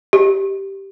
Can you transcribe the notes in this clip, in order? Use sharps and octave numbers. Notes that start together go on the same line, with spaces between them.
G4